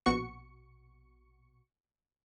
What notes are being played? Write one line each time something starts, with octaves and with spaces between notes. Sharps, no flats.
A#1 B2 F#4 C#6 C#7